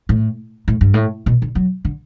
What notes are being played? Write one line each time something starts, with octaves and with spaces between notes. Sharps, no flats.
A2
A2
G2
A2
B2
D3
F#3
D3